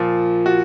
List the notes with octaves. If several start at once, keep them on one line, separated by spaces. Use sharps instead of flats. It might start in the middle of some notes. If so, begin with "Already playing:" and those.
Already playing: A#2 F3
F#4